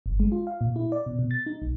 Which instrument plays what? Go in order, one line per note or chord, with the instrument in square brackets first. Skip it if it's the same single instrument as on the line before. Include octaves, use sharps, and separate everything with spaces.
[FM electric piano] G1
G#3
F4
F5
A#2
E4
D5
B2
B2
A6
D#4
B1